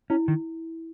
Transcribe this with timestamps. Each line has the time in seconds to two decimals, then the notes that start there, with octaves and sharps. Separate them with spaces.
0.10 C#4 E4
0.28 D#3